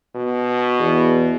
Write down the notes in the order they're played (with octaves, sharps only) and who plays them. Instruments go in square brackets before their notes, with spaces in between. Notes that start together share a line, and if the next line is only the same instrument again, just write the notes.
[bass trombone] B2
[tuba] E2